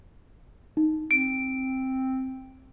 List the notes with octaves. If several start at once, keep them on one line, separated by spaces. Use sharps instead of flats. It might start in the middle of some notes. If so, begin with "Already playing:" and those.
D#4
C4 D7